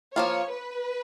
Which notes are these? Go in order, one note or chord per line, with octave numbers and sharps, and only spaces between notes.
F3 A#3 F4 C#5
B4